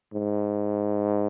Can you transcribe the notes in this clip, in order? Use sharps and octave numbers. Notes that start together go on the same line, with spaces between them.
G#2